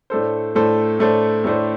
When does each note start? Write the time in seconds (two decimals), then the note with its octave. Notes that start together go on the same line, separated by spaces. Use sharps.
0.10 A2 A3 D4 A4 C5
0.55 A2 A3 D4 A4 C5
0.99 A2 A3 D4 A4 C5
1.44 A2 A3 D4 A4 C5